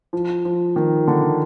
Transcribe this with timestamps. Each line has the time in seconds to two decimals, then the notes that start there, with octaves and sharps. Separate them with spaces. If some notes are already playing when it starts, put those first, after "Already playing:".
0.13 F3
0.45 F3
0.76 D#3
1.07 D3